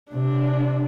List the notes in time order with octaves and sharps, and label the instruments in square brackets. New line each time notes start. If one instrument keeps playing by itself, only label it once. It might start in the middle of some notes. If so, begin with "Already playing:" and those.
[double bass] C3 [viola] D4